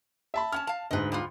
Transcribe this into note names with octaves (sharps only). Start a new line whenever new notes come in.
E5 A5 B5
C#4 F#5 A5 F6
F5 A5
D2 G#2 B4 D#5
G3 B3 F4